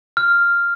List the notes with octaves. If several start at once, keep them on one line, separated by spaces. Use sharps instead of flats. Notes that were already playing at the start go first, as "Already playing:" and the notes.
F6